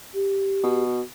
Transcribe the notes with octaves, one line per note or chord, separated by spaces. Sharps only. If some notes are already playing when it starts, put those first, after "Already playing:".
G4
B2